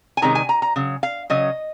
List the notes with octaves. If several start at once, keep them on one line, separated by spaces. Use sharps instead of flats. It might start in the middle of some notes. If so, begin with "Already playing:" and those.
G#5
C3 D#3 G#3 C#4 A#5
G#5
A#5
A#5
C#3 F#3
F5
C#3 F#3 C#4 D#5